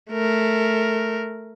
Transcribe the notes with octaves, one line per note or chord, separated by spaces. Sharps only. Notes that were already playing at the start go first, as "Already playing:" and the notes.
A3 A#4